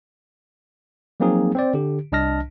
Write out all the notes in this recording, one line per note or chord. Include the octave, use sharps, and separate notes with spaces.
F3 F#3 A#3 C4 D#4 G#4
C4 C5 D5
D3 G4
C2 D4 D#5 A5 F6 A#6